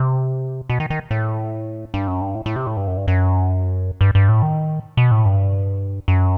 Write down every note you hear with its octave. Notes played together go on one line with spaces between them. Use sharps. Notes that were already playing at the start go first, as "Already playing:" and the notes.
Already playing: C3
B2
D#3
D#3
A2
G2
F#2
G2
A2
A2
C3
A2
G2
F#2
G2
F#2
G2
G2
A2
D#3
B2
A2
G2
F#2